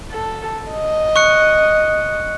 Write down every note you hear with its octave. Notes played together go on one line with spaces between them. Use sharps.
A4
D#5
C#6 F#6 C#7